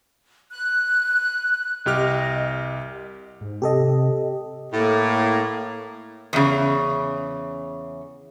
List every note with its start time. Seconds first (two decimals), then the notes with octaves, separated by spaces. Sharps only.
0.51 F#6
1.86 C2 G4 D#5 F6
3.41 G#2
3.62 C3 G4 A4 D#5
4.73 A2 A#3
6.33 E2 C#3